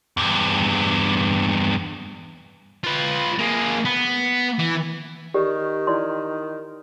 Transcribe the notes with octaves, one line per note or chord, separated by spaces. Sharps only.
E2 G2
F4 B4
A#3 G#4
B3
E3
D#3 G4 D5
E4 D5 C6